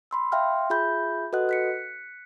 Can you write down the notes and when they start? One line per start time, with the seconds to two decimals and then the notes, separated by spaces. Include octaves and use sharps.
0.11 B5 C6 E6
0.32 E5 F5 G5 C6 F6
0.70 F4 G#4 E5 B5 G6
1.33 F#4 A4 B4 D#5 F#5 F#6
1.49 F#6 B6 C#7